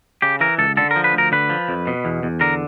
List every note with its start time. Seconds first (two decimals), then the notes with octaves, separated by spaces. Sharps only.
0.22 C#3 G4
0.40 E3 A#4
0.58 C#2 A4
0.77 D3 A4
0.91 A#4
0.96 F3
1.04 B4
1.14 D2 A#4
1.32 D3 B4
1.50 F3
1.69 F2
1.87 B2
2.05 E2
2.23 E2
2.41 D3 A#4